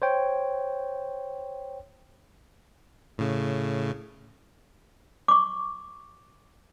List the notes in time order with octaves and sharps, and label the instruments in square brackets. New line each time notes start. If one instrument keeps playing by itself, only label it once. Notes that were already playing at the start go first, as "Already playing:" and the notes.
[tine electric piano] C5 C#5 G5
[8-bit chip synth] A2 C#3
[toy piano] C#6 D6